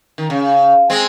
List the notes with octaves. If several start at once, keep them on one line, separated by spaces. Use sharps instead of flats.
D#3
C#3
G#3 C4